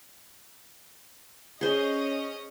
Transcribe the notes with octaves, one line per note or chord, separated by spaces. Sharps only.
C#4 G#4 C5 D#5